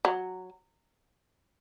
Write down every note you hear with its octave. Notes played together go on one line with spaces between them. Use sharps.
F#3